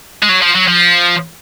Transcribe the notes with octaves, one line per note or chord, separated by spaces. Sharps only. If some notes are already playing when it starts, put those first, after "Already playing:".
G#3
F#3
F3
F#3
F3